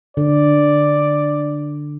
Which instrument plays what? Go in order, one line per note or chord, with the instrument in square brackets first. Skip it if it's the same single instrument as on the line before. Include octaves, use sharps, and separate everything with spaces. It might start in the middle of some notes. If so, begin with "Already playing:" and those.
[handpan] D3 [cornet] D5